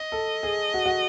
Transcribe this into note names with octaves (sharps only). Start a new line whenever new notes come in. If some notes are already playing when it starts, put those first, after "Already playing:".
Already playing: D#5
A4
G#4
F#4
F#4